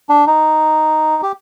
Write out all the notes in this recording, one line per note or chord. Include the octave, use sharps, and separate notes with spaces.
D4
D#4
G4